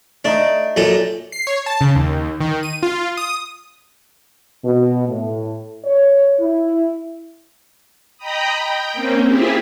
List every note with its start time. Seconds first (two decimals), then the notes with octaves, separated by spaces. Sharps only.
0.25 A3 D4 D#4
0.76 F#2 A#2 A4
1.32 C7
1.47 C#5
1.66 A5
1.81 C#3
1.95 D#2
2.40 D#3
2.63 D#7
2.83 F4
3.17 D#6
4.64 B2
5.08 A2
5.85 C#5
6.40 E4
8.18 D#5 G5 A#5 B5 D#6
8.58 G5
8.93 A#3 C4 C#4
9.26 C4 E4 F4 G4 G#4 E5